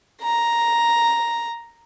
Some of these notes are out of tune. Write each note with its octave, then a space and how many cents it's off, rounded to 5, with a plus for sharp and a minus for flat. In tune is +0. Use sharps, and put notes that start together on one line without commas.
A#5 +5